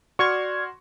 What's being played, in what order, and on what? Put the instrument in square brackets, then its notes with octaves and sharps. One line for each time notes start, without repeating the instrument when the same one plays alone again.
[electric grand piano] F#4 C6 [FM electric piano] D5 F6 G#6 [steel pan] C#6